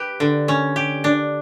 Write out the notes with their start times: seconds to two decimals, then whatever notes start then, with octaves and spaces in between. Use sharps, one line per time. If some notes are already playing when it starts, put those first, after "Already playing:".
Already playing: G4 B4
0.20 D3
0.48 C#4
0.76 G4
1.04 D4